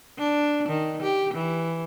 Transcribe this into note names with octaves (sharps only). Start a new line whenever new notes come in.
D4
D#3
G4
E3